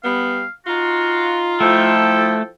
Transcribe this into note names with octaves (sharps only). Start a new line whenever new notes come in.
G3 B3 F5
D#4 F4 F#4
F3 A3 E4 A4 G5